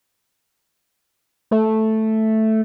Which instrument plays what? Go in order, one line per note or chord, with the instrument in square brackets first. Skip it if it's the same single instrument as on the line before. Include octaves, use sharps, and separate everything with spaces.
[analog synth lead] A3